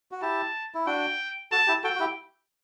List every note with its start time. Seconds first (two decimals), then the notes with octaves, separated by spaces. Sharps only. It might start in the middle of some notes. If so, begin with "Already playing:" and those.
0.11 F#4
0.22 E4 G4 A5
0.75 E4
0.87 D4 F#4 G5
1.52 F#4 A4 A5
1.67 E4 G4
1.84 F#4 A4 G5
1.96 F#4
2.00 E4 G4